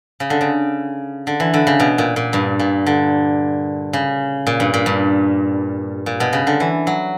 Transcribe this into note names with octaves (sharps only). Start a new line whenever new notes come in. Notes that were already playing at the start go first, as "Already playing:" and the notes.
C#3
D3
C#3
D3
E3
D3
C#3
B2
A#2
A#2
G2
A#2
D3
C#3
A#2
G2
A#2
G2
A#2
B2
C#3
D3
E3
F#3